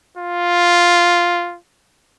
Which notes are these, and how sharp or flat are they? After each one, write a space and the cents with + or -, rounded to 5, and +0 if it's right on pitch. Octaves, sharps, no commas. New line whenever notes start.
F4 +0